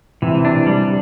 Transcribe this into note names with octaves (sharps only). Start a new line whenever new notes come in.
C3 E3
D4
G3